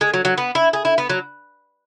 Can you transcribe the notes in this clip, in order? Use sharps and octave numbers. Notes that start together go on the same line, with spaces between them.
G#3
F#3
F#3
B3
E4
G#4
E4
B3
F#3